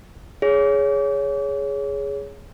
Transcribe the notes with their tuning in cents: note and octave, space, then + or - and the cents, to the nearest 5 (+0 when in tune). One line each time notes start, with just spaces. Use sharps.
G#4 +0 C#5 +15